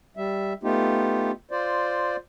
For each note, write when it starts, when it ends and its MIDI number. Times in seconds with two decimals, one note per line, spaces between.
0.17 0.53 55
0.17 0.53 76
0.63 1.31 57
0.63 1.31 59
0.63 1.31 63
0.63 1.31 65
0.63 1.31 67
1.51 2.16 65
1.51 2.16 72
1.51 2.16 74